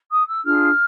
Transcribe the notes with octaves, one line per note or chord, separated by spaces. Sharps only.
D#6
E6
D4 F4 G#4 F6